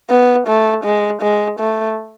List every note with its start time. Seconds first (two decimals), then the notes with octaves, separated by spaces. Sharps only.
0.10 B3
0.48 A3
0.84 G#3
1.22 G#3
1.59 A3